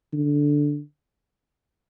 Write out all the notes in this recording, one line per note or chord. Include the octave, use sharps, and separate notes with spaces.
D3